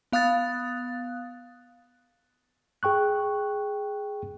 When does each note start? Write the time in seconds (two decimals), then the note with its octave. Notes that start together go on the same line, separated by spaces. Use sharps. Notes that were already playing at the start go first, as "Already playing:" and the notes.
0.13 B3 F5 D#6 F#6 A6
2.83 G#4 G5 C#6 F#6